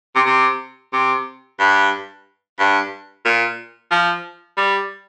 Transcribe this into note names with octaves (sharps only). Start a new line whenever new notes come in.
C3
C3
C3
G2
G2
A#2
F3
G3